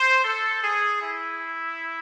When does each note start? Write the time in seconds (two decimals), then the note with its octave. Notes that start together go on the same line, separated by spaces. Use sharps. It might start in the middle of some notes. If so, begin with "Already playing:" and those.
Already playing: C5
0.24 A4
0.62 G#4
1.01 E4